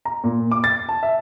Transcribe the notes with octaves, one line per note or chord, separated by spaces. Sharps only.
A#5
A#2
D6
A6
A5
E5